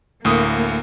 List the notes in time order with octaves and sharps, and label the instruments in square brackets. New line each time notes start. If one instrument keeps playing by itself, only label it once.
[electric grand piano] D2 A2 D#6 [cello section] A#3